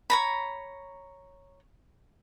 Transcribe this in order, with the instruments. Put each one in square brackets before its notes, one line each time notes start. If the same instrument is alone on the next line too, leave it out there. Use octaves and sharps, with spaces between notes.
[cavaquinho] C#5 A#5 B5